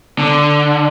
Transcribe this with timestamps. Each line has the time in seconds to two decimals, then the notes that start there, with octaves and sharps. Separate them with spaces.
0.19 D3